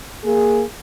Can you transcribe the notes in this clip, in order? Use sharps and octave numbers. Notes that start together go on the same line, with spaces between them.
A#3 G#4